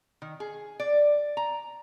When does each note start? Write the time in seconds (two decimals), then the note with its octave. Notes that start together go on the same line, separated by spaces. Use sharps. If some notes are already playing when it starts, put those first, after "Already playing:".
0.22 D#3
0.40 G#4
0.80 D5
1.37 A#5